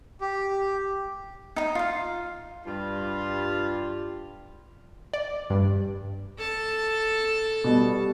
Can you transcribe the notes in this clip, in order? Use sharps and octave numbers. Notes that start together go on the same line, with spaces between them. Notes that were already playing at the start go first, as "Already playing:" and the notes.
G4
D#4 A#5
F4 F5
G2 G3 F4
D5
G2
A4 A5
B2 G3